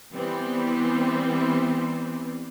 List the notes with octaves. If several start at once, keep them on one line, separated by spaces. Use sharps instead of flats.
E3 G3 B3 C4